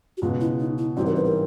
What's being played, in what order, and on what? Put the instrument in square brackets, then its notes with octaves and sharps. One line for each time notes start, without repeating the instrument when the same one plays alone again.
[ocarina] F#4
[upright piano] C#2 B2 G#3 [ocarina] F4
[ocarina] E4
D#4
E4
[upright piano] A1 G#2 E3 G3 C4 [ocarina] F#4
[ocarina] A#4
B4
A#4